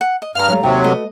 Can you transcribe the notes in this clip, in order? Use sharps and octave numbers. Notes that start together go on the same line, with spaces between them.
F#5
D#5
G2 F5 A#5 F6
F#3 G3 A3
D#2 C3 F#3 G5
A3 F#4 B4 D#5